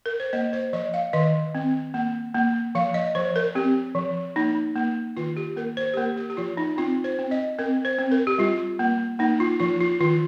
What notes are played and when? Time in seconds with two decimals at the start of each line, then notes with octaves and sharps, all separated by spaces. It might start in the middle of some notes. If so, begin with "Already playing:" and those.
0.06 A#4
0.20 C5
0.33 A#3 D#5
0.53 C5
0.73 F3 D#5
0.94 F5
1.13 D#3 D#5
1.55 C4
1.94 A#3
2.35 A#3
2.75 F3 F5
2.94 D#5
3.15 F3 C5
3.36 A#4
3.55 C4 G4
3.95 F3
4.36 A#3 D#4
4.76 A#3
5.17 D#3 F4
5.37 G4
5.56 A#3 A#4
5.77 C5
5.94 G4
5.97 A#3 A#4
6.17 G4
6.30 G4
6.37 F3 F4
6.57 D#4
6.78 C4 F4
7.04 C5
7.19 C4
7.31 D#5
7.59 C4 A#4
7.85 C5
7.99 C4
8.11 A#4
8.27 G4
8.38 G3 F4
8.79 A#3
9.19 A#3 D#4
9.40 F4
9.60 F3 F4
9.80 F4
10.00 D#3 F4